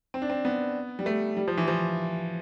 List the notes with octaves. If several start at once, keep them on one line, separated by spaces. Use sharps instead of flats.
C4
D4
C4
B3
G3
A3
G3
F3
E3
F3